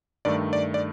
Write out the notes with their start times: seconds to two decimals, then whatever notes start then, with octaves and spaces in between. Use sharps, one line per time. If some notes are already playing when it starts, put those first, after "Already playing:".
0.25 G2 D#3 A3 D5
0.53 D5
0.74 D5